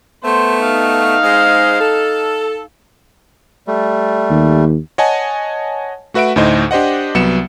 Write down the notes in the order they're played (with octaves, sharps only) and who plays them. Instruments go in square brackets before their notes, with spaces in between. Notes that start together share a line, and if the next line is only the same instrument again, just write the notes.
[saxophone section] A3 B3 [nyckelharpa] C5
[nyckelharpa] D#4 F5
[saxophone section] G#3 C5
A4
[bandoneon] G3 A3
[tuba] D#2
[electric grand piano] C#5 D#5 F#5 G#5 A5
A3 F#4 B4 E5 F#5 D7
D2 A2 D#4 C5 D#5
D4 G4 C5 D#5 F#5
C2 F#3 B3 C#7 E7